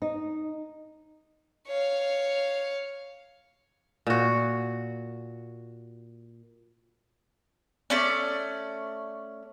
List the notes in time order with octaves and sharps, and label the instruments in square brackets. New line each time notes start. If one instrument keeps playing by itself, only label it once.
[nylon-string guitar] D#4
[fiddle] C#5 F5
[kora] A#2 F#4
[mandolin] A3 C#4 D5